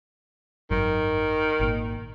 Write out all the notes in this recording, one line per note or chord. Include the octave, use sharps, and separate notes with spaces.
G#1 F#2 D#3
G#1 A#2